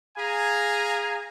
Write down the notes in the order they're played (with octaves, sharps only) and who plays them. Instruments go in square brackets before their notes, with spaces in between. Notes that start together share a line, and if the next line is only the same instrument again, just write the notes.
[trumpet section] G#4 F5 G#5 A#5